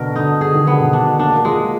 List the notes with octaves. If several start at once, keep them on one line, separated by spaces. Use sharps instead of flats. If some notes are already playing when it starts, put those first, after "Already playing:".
Already playing: B2 D3 A#4
D3 D#4
D3 G#4
D#3
D3 B3
B2
D4
A#3 D4
G#3 F4